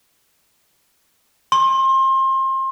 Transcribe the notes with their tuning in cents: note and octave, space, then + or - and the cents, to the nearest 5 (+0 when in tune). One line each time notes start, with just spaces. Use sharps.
C6 +30